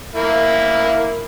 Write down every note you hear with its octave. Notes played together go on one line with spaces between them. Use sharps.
A#3 E4